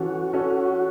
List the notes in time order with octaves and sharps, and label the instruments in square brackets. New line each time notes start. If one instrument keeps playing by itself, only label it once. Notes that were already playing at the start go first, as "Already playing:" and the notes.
Already playing: [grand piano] E3 C#4 A4 [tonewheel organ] F#4
[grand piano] C#4 A4